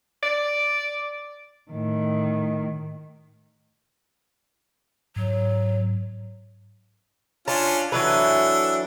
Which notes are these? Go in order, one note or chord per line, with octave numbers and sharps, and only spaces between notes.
D5
A2 D#3
G#2 F#3
C#4 D4 F4 A5
E3 F#3 D4 A4 B4